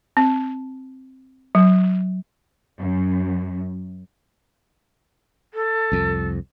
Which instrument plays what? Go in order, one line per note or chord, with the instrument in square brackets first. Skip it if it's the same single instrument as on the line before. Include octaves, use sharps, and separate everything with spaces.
[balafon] C4
F#3
[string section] F#2
[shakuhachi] A4
[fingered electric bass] C2 F2